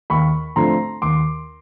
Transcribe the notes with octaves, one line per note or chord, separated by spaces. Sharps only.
D#2 B5 C#6
D3 F3 A3 C4 A#5 C6
D#2 C6 D6